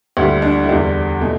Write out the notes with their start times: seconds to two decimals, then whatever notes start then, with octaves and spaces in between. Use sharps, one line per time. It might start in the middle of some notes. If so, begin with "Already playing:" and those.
0.17 D2 D3 G3 E4
0.42 D4
0.63 E4
0.68 E2 D3 G3 D4
1.21 B2 A3